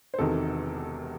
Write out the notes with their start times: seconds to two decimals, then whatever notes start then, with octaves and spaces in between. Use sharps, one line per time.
0.14 C5
0.19 E1 E2 C3 D#3 A4